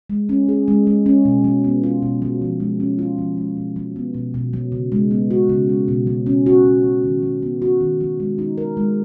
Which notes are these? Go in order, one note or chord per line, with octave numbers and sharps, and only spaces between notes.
G#3
C#4
G#4
G#3
G#3
C#4
B2
F#3
B3
F4
B2
F#3
F3
G#3
C#4
F4
F3
G#3
B2
F#3
B3
B2
B2
F#3
C#3
G#3
B3
F#4
C#3
G#3
B2
F#3
C#4
F#4
B2
F#3
D#3
F#3
B3
F#4
D#3
F#3
G#3
D#4
A#4
G#3